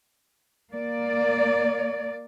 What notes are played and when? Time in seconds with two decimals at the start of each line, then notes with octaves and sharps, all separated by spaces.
0.72 A#3 D5